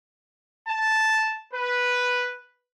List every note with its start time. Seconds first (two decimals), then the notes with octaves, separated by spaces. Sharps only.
0.67 A5
1.54 B4